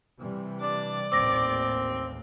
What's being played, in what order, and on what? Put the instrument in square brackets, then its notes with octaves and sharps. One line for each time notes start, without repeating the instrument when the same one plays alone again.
[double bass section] C3 E3 G3
[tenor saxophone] D4 [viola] D5
[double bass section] A1 D#2 A#2 [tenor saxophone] C4 [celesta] D6 A#6